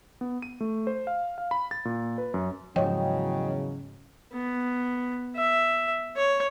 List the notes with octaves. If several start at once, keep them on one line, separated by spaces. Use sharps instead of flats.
B3
D#7
A3
C5
F5
F5
B5
A6
A#2
B4
F#2
E2 G#2 C#3 F3 F#3 C#5 D#5 G5
B3
E5
C#5